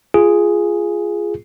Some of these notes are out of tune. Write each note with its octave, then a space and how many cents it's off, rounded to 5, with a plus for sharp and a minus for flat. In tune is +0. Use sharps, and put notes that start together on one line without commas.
F4 -10 G#4 +0